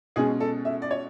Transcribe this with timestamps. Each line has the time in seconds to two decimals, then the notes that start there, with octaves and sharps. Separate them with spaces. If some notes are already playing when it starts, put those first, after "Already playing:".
0.16 B2 G#3 C#4 G#4
0.40 A4
0.65 E5
0.82 D5
0.91 C#5